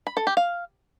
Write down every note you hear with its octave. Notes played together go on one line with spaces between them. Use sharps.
B5
A4
G4
F5